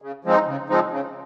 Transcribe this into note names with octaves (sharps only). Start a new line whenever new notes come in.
C#3
F3 G#3 C4 D#4
C#3
F3 G#3 C4 D#4
C#3